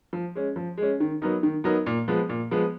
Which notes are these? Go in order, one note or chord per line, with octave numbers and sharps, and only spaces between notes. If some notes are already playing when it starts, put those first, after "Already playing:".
F3
G#3 C#4
F3
G#3
C#4
D#3
F#3 B3 D#4 A#4
D#3
F#3 B3 D#4 A#4
A#2
F3 G#3 B3
A#2
F3 G#3 B3